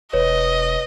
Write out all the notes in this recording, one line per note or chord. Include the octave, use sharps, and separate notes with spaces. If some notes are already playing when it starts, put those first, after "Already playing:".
E1 B4 C#5 D#5